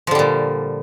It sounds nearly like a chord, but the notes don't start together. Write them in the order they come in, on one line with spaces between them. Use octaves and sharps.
F3 D3 G3 A#2